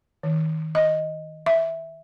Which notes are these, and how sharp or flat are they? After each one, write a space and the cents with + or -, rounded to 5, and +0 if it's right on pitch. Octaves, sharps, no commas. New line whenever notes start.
D#3 +25
D#5 +0
E5 -5